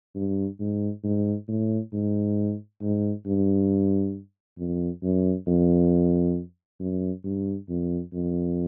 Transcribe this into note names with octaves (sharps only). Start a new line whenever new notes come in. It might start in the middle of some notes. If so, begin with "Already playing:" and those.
G2
G#2
G#2
A2
G#2
G#2
G2
F2
F#2
F2
F#2
G2
F2
F2